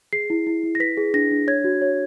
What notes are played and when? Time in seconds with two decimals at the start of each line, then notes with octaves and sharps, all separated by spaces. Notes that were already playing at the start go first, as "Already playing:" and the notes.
0.13 G#4 C7
0.30 E4
0.47 E4
0.63 E4
0.75 A#6
0.80 B4 B6
0.97 G#4
1.14 D4 A#6
1.31 D4
1.47 C#5 G#6
1.64 F#4
1.82 C#5